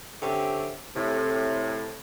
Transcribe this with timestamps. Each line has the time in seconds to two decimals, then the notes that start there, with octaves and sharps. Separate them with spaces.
0.22 D3 C4 C#4 G4 E5
0.96 A2 C3